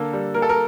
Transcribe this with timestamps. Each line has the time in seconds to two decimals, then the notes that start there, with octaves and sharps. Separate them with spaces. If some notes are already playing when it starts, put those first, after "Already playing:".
Already playing: D3 A#3 A4
0.13 G3
0.34 A#3 A#4
0.42 A4
0.49 A#4